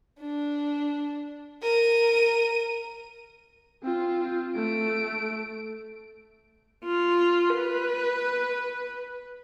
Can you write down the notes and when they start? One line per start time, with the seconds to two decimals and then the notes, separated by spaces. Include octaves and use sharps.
0.19 D4
1.62 A#4 D#7
3.83 C4 F4
4.56 A3 D7
6.84 F4
7.55 B4